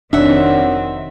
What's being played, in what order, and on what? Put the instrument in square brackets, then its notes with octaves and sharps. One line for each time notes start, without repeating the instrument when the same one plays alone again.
[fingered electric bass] F1 D4 [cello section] D#3 C4 [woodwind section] F#3 G3 [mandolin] E5 F#5